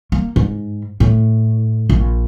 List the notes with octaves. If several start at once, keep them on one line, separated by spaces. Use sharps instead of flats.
A#3
G#2
A2
A#1